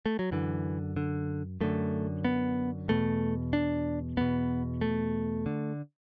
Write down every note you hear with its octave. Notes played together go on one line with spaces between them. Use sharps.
A3
F#3
F#2 D3 E3
D3
F#2 D3 A3
B3
E2 B2 A3
D4
E2 B2 B3
A3
D3